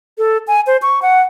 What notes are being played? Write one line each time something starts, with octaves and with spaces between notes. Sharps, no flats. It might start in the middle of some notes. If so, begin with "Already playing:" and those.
A4
G#5
C5
C#6
F#5